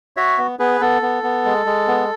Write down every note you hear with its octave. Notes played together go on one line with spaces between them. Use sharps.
F#4 C#5 E5
B3
B3 G#4 B4
B3 A4
B3
B3
G#3
G#3
B3